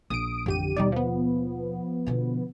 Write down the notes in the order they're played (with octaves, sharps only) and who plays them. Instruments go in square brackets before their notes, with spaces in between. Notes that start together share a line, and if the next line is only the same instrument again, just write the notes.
[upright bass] A#1 [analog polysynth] D#6 D7
[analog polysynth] A1 G4 D#7 [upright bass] F2 D3
[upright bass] D#2 B2 [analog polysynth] G3 D#4 D5
[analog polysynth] F3 B3
[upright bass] B2 D3